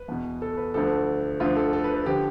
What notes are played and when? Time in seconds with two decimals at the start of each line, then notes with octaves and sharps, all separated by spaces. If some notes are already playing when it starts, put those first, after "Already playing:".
Already playing: B4
0.08 E2 B2
0.42 A4
0.57 B4
0.74 D2 D3 F3 A4
1.40 D2 D3 F3 F4
1.57 A4
1.73 A4
1.84 B4
1.94 A4
2.06 D3 F3 G4